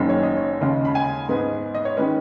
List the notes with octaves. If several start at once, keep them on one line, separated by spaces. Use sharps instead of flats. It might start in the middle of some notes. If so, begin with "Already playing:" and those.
Already playing: F#1 F#2 D#3 G#3 C#4
C#5
D#5
C#5
D#2 C#3 G#3 C#4
B5
G#5
G#2 G#3 B3
D#5
C#5
D#3 G#3 C#4 B4